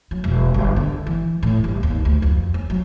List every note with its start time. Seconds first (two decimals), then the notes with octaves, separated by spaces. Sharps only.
0.11 F#3
0.24 E1
0.54 G1
0.76 D3
1.07 E3
1.43 A2
1.64 G1
1.83 D#2
2.05 D2
2.22 F2
2.54 C#4
2.70 F#3